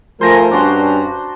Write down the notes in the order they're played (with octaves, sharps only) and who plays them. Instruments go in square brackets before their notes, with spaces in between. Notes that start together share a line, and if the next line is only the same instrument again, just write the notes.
[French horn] F3 [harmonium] A3 A#4 G#5 [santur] C5 A#5
[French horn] G2 [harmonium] C#4 A#5 [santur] D4 F#4 C6